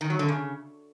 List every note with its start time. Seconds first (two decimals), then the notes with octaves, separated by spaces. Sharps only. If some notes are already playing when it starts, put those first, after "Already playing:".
0.01 D#3
0.10 F#3
0.19 D3
0.28 C#3